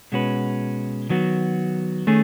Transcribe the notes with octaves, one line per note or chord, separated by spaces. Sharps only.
B2 G#3 C#4 F#4 B4
D#3 F#3 B3 F#4
D#3 A3 C#4 G#4